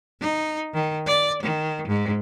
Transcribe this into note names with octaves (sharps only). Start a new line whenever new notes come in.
D#4
D#3
D5
D#3
G#2